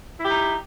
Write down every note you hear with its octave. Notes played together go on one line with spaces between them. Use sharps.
D#4 E4 G4